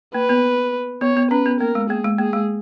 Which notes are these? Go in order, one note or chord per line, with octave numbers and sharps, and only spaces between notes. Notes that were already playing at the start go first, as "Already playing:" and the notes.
A#3 B4
B3
B3 C#5
B3
C#4 B4
B3
A#3 A#4
G#3
A#3 G#4
G#3
A#3 G#4
G#3